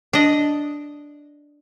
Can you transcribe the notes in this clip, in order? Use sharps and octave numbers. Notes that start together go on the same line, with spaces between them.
D4 D#5